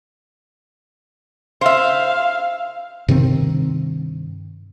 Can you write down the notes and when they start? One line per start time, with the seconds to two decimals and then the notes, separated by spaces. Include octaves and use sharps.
1.61 C5 E5 F5
3.08 G2 C3 D#3 C4